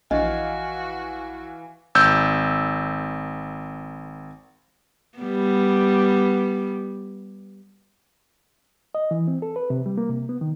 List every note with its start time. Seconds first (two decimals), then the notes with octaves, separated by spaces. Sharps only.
0.11 A#1 E3 F#4 D#5 F5 G#5
1.95 G#1 E6 G6
5.18 G3 B3
8.95 D#5
9.11 E3
9.28 C4
9.42 A4
9.56 B4
9.70 C3
9.86 G3
9.98 A#3
10.10 C3
10.29 B3
10.41 D#3